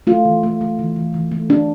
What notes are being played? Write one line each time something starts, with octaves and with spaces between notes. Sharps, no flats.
A3 F4
E3
A3
A3
E3
E3
E3
A3
A3 D4